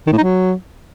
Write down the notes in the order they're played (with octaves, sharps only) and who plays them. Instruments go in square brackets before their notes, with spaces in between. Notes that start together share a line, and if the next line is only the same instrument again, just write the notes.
[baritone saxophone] D#3
A2
D#4
F#3